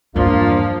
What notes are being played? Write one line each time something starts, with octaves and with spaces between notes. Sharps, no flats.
E2 G2 F3 A#3 D4 F4